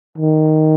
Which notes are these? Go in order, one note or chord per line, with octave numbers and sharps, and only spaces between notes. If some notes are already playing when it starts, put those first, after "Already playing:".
D#3